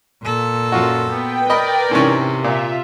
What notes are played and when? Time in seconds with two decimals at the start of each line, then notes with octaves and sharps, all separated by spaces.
0.23 A#2 A4
0.72 F#2 F4 F#4
1.10 B3 B4 G5
1.50 A#4 D5 D#5 B5
1.91 G#2 C3 E3 C#4
2.44 A#2 F4 E5